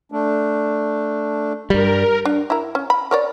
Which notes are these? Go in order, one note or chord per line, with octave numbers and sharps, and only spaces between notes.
A3 D4
G2 G3 A#4
D4
E4 A#4
C#4
B5
A#4 C#5 D5